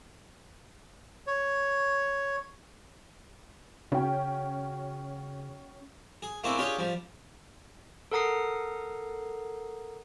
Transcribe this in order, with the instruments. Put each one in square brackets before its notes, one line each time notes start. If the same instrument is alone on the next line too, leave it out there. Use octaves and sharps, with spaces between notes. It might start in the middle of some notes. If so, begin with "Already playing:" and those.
[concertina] C#5
[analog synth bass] C#3 [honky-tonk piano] C#4 F#4 G5
[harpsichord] G#4
A3 A#3 C4 D4 E4 G#4
C#4 D4 F4 G4 G#4 C#5
F3 G3
[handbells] A4 A#4 F#5 A#5 D#6 C7